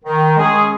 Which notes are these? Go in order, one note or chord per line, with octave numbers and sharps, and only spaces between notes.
D#3
G#3 C#4 G#4